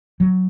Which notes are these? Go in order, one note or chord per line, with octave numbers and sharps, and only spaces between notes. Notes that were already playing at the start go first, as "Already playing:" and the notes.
F#3